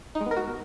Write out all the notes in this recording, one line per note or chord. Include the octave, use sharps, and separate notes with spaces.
D#4
G#3
B3
A#4
F#4